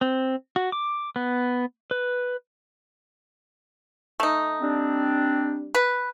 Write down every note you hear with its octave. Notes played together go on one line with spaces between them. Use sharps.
C4
F#4
D6
B3
B4
A3 D#4
G3 C4 D4
B4